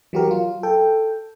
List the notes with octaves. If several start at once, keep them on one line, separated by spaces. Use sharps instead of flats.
E3 F#3 F#4 G4 A#4
F#3 F4
A4 G5